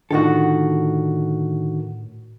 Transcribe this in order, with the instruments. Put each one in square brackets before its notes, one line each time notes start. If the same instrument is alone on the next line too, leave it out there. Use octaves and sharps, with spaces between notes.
[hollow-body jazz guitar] A2 F4 A4 [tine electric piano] D3 D#3 F#4